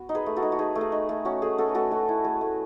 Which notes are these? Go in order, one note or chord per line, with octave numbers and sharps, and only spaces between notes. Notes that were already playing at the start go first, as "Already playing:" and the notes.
Already playing: B3 F#4
D#4
G#4 B4
A3
F#4 A4
D#4
F#4
D#4 G#4
A3
G#4
D#4
A3
C#4 F#4
A3 G#4
C#4 F#4 A4
B4
A3 F#4 A4
A3 F#4
E4
A3 G#4
A3